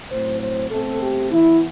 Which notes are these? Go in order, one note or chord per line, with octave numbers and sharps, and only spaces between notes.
A2 F#3 C4 C5
C5
B2 A3 C4 A4
G4
E3 B3 E4